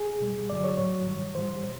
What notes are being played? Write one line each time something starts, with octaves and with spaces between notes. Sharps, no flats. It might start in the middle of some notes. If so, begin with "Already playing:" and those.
Already playing: G#4
B2 G3
G2 D3 F#3 D5
C#5
A2 F#3 C#5
G2 D#3 G3
A2 E3 G3 C5
B2 C5